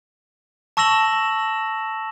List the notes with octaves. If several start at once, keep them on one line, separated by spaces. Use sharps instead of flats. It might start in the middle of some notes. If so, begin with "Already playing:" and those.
A5 C#6 E6 A#6 E7 F#7